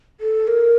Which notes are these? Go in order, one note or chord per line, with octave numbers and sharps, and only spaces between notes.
A4
A#4